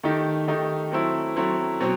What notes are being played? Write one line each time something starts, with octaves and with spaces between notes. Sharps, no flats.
D#3 A3 D#4 G4
D#3 A3 D#4 G4
F#3 A3 C4 E4
F#3 A3 C4 E4
B2 F#3 C4